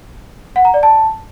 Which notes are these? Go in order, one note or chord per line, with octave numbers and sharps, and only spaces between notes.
F#5
A#5
D5
A5